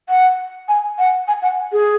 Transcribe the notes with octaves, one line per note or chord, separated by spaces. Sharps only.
F#5
G#5
F#5
G#5
F#5
G#4